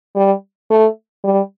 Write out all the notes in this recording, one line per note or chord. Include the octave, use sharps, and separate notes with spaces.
G3
A3
G3